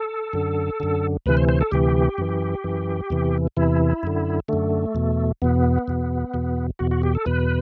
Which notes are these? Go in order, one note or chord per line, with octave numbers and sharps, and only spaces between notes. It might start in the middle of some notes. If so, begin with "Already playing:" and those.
Already playing: A4
F#2 D3
F#2 D3
D2 C3 E3 B4
C5
C5
A4
D2 C3 E3 G4
F#2 E3
F#2 E3
E2 C3 E3
E2 C3 E3 E4
F#2 D3
F#2 D3 A3
E2 B2
E2 B2 B3
E2 B2
E2 B2
E2 B2 F#4
F#4
G4
A4
E2 B2 B4